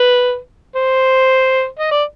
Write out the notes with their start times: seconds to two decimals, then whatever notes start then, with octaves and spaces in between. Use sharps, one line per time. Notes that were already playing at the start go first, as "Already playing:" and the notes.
Already playing: B4
0.76 C5
1.79 D#5
1.91 D5